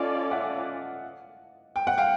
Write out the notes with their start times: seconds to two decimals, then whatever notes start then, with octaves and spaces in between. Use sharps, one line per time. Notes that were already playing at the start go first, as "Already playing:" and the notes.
Already playing: C#4 F4 A4 D5 D#5 F5
0.31 E5 F#5
1.76 G5
1.87 F#5
1.98 F5 G5